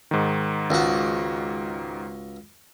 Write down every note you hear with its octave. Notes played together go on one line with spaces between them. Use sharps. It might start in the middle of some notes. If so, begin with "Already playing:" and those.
G#2 D#3
C#2 F#4